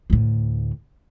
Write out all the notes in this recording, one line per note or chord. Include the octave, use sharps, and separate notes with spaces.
D2 A2